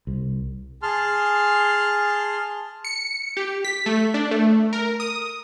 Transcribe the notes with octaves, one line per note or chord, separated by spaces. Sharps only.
C2
G#4 A5 C6 F6
C#7
G4
B6
A3
D4
A3
A#4
D#6